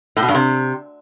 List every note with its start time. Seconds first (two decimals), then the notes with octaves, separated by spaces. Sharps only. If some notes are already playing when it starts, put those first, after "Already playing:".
0.17 A2
0.22 B2
0.28 G2
0.34 C3